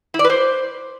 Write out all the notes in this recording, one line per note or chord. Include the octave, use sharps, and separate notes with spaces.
E4
D5
B4
C5